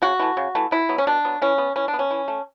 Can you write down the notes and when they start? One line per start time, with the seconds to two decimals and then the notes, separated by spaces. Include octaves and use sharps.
0.02 C#3 F#4
0.20 E3 A3
0.37 C#3
0.55 E3 A3
0.71 B2 E4
0.89 F#3 B3
0.98 C#4
1.07 B2 D4
1.25 F#3 B3
1.42 E3 C#4
1.58 B3
1.76 E3 C#4
1.88 D4
1.93 B3
1.99 C#4
2.11 E3
2.28 A3